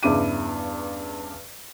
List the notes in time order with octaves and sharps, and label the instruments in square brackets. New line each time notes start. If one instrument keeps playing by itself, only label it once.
[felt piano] E2 G2 C#3 E4 D6 D#7